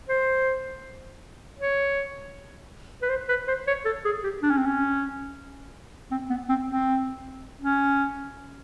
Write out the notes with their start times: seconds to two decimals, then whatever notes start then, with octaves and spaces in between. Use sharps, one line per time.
0.09 C5
1.59 C#5
3.02 B4
3.10 C5
3.29 B4
3.48 C5
3.67 C#5
3.85 A4
4.05 G#4
4.24 G4
4.42 D4
4.50 C#4
4.58 C4
4.66 C#4
6.11 C4
6.30 B3
6.49 C4
6.68 C4
7.62 C#4